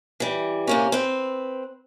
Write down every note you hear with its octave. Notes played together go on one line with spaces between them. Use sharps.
E3 G3
C3 A#3 C#4
C4 B4